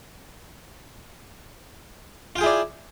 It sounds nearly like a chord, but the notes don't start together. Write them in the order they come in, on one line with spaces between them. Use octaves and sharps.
F4 G5 G#4 E4 D5